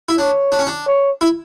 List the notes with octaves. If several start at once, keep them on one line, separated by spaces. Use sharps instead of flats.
E4
D4 C#5
D4
C#4
D4
C#5
E4